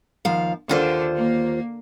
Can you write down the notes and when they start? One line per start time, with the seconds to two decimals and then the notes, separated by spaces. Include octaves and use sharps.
0.25 D#2 F3 F5
0.69 D#2 D3 F4 C5
1.15 A#3